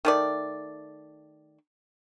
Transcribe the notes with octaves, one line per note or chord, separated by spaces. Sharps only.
D#3 A3 D5